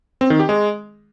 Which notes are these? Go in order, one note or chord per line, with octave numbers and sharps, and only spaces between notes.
C4
D#3
G4
G#3